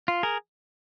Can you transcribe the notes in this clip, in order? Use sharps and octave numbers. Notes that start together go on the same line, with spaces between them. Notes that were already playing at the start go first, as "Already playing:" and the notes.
F4
G#4 A#4